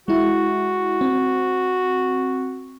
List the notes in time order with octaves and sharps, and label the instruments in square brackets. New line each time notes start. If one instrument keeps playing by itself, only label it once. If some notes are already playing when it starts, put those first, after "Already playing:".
[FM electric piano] G#3 E4 [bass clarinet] F#4
[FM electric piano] C4